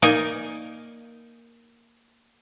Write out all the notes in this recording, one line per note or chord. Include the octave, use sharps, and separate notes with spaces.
A#3 D#4 A#4 D5 D#5 G#5